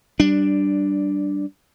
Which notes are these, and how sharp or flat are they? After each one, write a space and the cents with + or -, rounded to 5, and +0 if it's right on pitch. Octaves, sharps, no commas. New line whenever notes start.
G3 -15 D4 +0